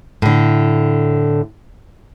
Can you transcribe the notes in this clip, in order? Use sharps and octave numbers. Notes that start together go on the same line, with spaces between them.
A2 D3